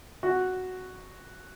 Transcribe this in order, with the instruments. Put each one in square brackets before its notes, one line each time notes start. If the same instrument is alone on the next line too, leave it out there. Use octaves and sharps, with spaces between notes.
[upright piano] F#4